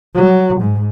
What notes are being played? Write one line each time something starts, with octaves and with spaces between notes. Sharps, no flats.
F#3
G#2